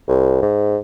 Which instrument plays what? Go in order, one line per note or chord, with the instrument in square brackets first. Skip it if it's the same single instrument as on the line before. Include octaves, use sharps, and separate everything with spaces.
[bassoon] C2
G#2